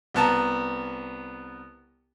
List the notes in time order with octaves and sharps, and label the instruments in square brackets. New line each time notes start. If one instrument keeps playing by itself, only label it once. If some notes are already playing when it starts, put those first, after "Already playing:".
[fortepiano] C2 B3 A5 A#5